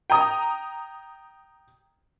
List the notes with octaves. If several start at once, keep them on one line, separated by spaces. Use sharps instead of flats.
G5 A#5 D#6